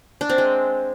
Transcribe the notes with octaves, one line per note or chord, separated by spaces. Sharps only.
D4
C4
G#3